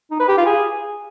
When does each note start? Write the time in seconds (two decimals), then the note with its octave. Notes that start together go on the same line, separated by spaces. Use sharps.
0.11 D#4
0.20 B4
0.28 G4
0.37 F4
0.46 G#4